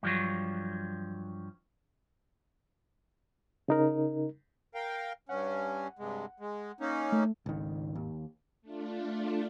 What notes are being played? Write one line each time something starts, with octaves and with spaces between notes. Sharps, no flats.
G2 F3 F#3
C#3 D#4 A#4
A#4 F5 G5
G2 C#4 F#5
G2 C3 G#3
G#3
A#3 C#4 D#4
A3
G#1 C#2 D#3
D#2
A3 D4 F4